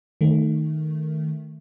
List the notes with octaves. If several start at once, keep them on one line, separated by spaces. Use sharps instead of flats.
D#3 A3